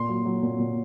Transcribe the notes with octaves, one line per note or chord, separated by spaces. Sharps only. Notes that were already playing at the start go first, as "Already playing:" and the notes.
Already playing: A#2 C6
F#3
F#3
A#2
A#2